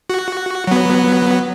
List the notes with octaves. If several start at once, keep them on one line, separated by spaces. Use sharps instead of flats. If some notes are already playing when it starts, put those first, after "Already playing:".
F#4
F#3 B3